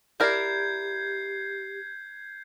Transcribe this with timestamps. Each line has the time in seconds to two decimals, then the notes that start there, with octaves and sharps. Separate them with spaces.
0.20 E4 G4 A#4 D5 G6 G#6 C7